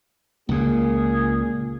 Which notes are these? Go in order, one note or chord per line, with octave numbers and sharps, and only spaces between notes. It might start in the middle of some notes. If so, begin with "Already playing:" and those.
C#2 A#2 A#3 G#4